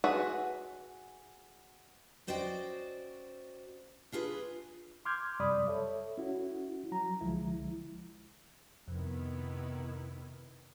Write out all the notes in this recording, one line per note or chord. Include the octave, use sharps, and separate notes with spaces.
F#4 G#4 B4 E5 F#5
C#4 F#4 C5 D5 D#5 G5
D4 F4 G#4 B4
C6 D6 F6 G6 G#6
F#2 C3 G3 D5 B5 D#6
A4 C#5 E5
C#4 E4 F#4
F#3 A#5
C2 D3 F3 G#3 E4
F2 C3 D#3 B3 E4